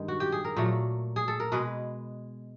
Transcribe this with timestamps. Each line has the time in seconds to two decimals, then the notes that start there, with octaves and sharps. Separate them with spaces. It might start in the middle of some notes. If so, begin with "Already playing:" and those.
Already playing: G2 D#3 G#3
0.08 F#4
0.20 G4
0.32 G#4
0.45 A#4
0.57 A#2 F#3 A3
1.16 G#4
1.28 A4
1.40 A#4
1.52 B2 G#3 B4